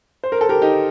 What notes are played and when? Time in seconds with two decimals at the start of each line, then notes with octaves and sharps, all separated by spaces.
0.23 C5
0.32 A#4
0.41 A4
0.49 G4 A#4
0.62 D#4 G4